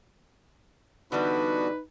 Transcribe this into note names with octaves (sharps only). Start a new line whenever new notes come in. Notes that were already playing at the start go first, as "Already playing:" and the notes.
D3 E3 G3 B3 D4 D#4 F#4 B4